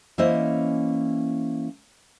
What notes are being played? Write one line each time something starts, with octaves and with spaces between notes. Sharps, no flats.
E3 A#3 C#4 E4 C5 D#5